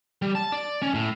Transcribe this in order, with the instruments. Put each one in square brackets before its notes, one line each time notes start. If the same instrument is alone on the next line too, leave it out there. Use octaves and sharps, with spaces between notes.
[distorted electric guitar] G3
A5
D5
C#4
A2